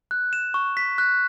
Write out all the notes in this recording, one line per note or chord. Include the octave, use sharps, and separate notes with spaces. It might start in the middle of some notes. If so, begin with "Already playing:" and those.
F#6
E7
C#6
B6
F#6